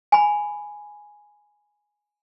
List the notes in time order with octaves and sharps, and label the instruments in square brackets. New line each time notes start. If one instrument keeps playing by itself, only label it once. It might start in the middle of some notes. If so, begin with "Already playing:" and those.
[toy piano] G#5 B5